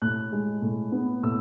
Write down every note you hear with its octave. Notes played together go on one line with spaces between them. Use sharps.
A2 F#6
G#3
A2
B3
A2 E6